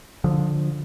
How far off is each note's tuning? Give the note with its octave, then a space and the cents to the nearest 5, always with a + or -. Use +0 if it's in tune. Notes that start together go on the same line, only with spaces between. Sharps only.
D3 +0 F3 +15